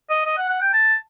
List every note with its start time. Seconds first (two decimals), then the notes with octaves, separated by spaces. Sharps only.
0.10 D#5
0.25 D#5
0.37 F#5
0.49 F#5
0.61 G5
0.73 A5